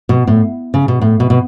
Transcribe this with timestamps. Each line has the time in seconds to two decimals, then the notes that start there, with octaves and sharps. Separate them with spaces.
0.09 B2
0.27 A2
0.74 C#3
0.88 B2
1.01 A2
1.20 B2
1.30 B2